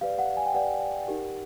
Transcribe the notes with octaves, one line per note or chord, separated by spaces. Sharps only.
G4 B4 D5 F5
F#5
G#5
G5
G4 B4 D5 F#5
D#4 G4 A#4